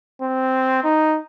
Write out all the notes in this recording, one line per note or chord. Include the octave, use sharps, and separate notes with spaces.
C4
D#4